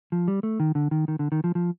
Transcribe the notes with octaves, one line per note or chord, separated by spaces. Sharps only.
F3
G3
A3
D#3
D3
D#3
D#3
D3
D#3
F3
F3